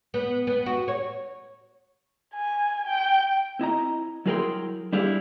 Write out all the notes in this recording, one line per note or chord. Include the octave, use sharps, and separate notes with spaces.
B3
B3
F#4
C#5
G#5
G5
C4 E4 D#5 A#5
F#3 E4 G#4 A#4 G5 C6
G3 D4 E4 G4 G#4 F5